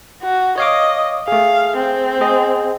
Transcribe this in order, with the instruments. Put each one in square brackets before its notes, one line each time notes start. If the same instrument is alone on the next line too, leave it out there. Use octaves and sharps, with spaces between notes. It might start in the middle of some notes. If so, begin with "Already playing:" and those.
[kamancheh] F#4
[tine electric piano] C#5 F5 D6 [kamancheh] D#5
[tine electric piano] A3 G#4 [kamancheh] F5
[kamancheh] C4
[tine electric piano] G#4 D#5